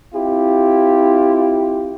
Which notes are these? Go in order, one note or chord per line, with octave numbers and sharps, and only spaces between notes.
C4 E4 F4 G4